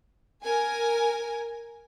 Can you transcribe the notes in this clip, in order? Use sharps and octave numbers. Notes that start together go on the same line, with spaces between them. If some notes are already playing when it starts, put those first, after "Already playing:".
A#4 G#5